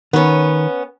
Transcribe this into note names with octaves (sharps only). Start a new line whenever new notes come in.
D#3 B3 C#4